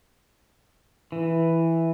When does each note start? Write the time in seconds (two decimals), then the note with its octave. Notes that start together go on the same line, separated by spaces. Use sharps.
1.12 E3